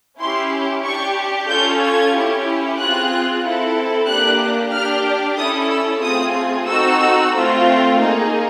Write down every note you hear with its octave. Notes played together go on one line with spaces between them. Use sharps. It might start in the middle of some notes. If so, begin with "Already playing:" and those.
C#4 E4 G4 C6
D4 G4 C#6
C#4 F4 A4 G6
G#6
C#4 E4 G4
C4 F4 G#4 F#6
C4 E4 A4
A#3 D4 G4 F#6
D4 G4 F6
C#4 E4 A4 D#6
E6
A3 C4 F4 G#4 D#6
C4 D#4 F#4 A4 E6
A3 C4 F4
A#3 D#4 G#4